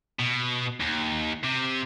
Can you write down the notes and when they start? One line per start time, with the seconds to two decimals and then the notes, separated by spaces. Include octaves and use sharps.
0.19 B2
0.80 D#2
1.44 C3